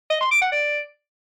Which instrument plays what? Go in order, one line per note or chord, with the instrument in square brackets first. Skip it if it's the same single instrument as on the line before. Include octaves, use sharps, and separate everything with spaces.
[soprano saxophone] D#5
C6
D6
F#5
D5